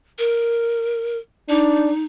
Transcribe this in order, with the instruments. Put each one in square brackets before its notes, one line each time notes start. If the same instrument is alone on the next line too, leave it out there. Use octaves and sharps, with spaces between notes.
[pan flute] A#4
[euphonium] D4 [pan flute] D#4